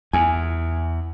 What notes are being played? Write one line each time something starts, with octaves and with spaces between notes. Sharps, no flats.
E2 G#5